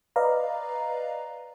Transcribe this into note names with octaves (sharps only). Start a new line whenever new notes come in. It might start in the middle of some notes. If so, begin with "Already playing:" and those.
B4 D5 D#5 F5 A#5